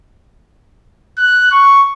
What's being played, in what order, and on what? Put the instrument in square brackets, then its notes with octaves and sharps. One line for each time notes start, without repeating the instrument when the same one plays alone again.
[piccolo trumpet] F#6
C#6